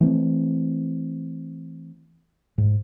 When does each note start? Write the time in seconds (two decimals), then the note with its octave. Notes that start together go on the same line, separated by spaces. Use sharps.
0.01 E3 A3 C4
2.58 G#2